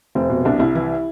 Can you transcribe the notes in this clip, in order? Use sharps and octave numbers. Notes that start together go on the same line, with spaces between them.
F1 C4
B2
C2 D4
C2 E4
E3 E4